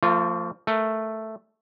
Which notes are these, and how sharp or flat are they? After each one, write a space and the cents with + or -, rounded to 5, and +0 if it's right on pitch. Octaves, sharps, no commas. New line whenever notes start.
F3 +0 A3 +45 F4 +0
A3 +0 A#4 +0